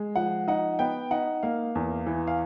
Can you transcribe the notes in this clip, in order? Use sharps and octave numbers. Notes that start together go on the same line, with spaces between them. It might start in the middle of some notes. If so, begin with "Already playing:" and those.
Already playing: G#3
F3 F#5
D#4 F#5
B3 G5
D#4 F#5
A#3 F5
E2
E3
F5